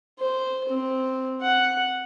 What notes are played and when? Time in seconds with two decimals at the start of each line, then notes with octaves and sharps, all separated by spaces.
0.19 C5
0.69 C4
1.41 F#5